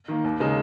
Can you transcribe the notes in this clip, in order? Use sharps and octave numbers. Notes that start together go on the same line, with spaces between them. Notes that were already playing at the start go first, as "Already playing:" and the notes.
D#3 A#3
D#2
C#3 G#3 D#4